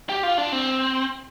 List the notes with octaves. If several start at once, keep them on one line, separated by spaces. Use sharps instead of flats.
G4
F4
D4
C4